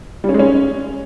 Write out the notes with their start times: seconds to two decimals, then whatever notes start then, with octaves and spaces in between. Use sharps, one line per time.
0.24 G3
0.29 C#4
0.34 G#3
0.39 C#4